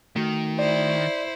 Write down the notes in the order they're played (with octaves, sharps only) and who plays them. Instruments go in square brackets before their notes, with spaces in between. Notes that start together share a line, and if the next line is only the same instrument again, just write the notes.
[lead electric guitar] D#3 [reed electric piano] A3 F#4
[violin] E4 C5 [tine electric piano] D5